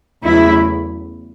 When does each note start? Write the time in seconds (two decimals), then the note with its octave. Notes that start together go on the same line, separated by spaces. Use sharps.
0.24 E2 C#3 F#3 A3 E4